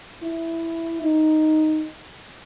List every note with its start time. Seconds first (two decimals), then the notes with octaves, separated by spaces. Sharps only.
0.23 E4
1.02 D#4